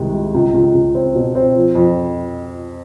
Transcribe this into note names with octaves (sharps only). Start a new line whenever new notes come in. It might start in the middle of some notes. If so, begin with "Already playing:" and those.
Already playing: C2 C3 D#3 G#3
G#3
C#2
C#2
C#2
C4
B2
C4
F3
F2